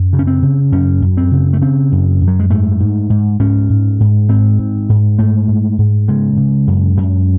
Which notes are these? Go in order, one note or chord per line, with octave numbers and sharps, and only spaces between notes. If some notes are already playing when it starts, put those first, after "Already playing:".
Already playing: F#2
C#3
C#4
C4
C#3
F#2 C#4
F#2
C4
C#3
A3
C#3 C4
F#2
F#2
F#3
G#3
G#2 A3
G#2
G#2
G#2 C#4
G#2
G#2
G#2 C4
G#2
G#2
G#2 A3
G#2
G#2
C#3 G#3
C#3
F#2
F#2